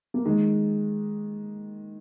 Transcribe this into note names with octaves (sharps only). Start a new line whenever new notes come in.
A#3
D#3 G#3